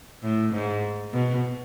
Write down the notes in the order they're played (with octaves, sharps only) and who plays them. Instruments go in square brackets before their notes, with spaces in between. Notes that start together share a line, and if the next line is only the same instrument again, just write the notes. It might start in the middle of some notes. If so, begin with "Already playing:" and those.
[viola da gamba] A2
G#2
B2